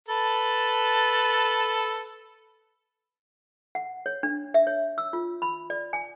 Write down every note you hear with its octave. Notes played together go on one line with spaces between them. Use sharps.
A4 B4 A5
F#5
C#5
D4
E5
C#5
E6
F4
B5
D5
G#5